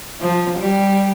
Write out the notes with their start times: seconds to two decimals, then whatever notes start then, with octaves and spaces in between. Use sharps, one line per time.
0.21 F3
0.59 G3